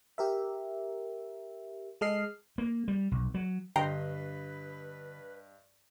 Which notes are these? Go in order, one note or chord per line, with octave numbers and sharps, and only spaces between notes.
G4 A#4 E5
G#3 A4 D#5 F6 C7
A#3
G3
B1
F#3
G2 D3 B4 D#5 G5 A#5 C6 C7